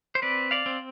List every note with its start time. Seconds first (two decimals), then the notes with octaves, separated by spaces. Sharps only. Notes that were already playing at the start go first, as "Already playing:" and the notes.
0.15 C5
0.22 C4 B4 D5
0.51 D5 F5
0.66 C4